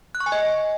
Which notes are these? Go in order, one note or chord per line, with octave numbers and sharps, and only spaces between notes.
F#6
C#6
G#5
D#5